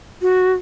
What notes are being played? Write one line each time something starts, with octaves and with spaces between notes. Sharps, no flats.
F#4